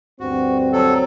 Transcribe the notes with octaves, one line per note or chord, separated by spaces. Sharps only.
D2 G2 C4 F#4
F#3 A4